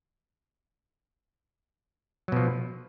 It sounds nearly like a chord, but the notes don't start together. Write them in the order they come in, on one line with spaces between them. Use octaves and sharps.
F#3 B2 F3